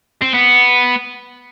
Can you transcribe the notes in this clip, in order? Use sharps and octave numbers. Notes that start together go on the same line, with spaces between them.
C4
B3